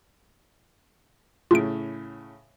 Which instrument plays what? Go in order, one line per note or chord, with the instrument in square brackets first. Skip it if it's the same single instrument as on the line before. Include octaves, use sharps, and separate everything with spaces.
[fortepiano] A2 C#3 [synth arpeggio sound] F4 D7